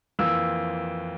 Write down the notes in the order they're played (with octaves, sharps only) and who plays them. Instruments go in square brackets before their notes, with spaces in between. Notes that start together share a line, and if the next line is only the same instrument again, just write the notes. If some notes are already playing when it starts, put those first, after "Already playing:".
[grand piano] F2 E3 A#3 F4 [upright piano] E6